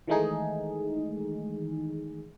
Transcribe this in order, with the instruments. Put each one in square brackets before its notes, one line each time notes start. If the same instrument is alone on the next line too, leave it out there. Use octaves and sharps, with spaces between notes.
[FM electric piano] D#3 E3 G#3 A3 D#4 G#4